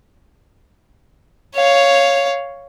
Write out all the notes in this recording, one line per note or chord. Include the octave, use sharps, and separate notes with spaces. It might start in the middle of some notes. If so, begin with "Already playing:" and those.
C#5 F5